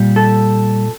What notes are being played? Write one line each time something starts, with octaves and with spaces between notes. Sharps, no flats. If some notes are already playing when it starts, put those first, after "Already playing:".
Already playing: A#2 G3
A4